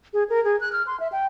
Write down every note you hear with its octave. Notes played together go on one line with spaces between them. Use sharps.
G#4
A#4
G#4
F#6
F6
C6
E5
G5